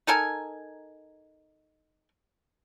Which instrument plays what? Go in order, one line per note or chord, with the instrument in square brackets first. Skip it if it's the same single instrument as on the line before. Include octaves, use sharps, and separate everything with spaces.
[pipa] D#4 A4 A#4 G#5